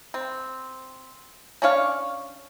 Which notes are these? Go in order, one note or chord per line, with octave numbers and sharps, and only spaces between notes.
C4
C#4 D4 C#5 F5